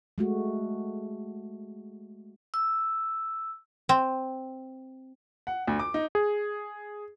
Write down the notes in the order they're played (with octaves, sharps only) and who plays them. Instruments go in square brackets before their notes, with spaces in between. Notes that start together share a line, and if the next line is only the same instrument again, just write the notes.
[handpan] G#3 A3 F#4
[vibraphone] E6
[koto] C4
[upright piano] F#5
D2
D6
D#4
[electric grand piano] G#4